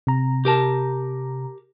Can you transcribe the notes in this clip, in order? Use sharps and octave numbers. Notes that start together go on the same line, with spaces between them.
C3 A#5
G4 A#4 A5